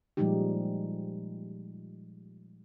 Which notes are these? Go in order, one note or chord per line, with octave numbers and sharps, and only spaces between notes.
A#2 F3 G3 G#3 D#4 G4